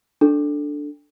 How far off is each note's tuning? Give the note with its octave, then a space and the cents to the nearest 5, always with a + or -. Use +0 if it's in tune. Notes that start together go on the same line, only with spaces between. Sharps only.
D4 +0 A4 +0